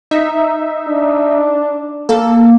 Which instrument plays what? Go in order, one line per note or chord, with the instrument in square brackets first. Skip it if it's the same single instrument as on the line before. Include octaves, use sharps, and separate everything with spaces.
[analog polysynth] D#4 E5
[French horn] D4
[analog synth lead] A#3 [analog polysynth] A4